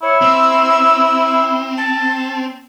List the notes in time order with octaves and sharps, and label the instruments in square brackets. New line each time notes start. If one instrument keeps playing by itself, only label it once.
[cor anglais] E4 [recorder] C#5
[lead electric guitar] C4 [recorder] E6
[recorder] A5